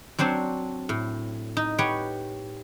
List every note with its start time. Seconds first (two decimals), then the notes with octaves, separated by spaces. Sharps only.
0.19 F#3 C4 D4 C5 C#5
0.89 A2
1.57 D#4
1.78 G4 B4 C#5 F#5 G5